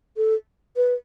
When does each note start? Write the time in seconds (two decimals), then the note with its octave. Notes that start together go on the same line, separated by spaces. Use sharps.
0.17 A4
0.76 B4